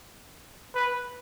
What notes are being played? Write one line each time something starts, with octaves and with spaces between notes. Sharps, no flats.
B4